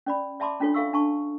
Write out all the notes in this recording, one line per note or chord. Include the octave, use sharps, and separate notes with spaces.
C#4 D5 B5
D5 E5 A5 B5 C6 D6
C#4 D4 F4 A4 C#5
A4 E5 F5 C#6 E6
D4 A5 C#6